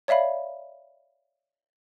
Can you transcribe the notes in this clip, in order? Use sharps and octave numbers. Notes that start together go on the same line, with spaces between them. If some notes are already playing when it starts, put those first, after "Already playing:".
C#5 D5 E5 F5 B5